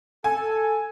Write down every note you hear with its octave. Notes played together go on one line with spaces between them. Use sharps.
A4 G#5